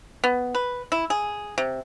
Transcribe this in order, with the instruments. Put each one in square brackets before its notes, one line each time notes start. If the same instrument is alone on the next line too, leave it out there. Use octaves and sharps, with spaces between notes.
[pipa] B3
B4
E4
G#4
C3